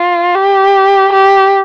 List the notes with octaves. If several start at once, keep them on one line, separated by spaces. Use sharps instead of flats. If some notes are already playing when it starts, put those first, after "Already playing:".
Already playing: F4
G4
G4